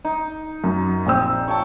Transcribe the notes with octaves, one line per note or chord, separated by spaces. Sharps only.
D#4
F#2
A#1 C4 E6
C#5 G5 A5